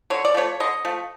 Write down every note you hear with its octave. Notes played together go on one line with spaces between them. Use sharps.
D3 C#5
D5
F3 A3 C#5
D3 D#5
F3 A3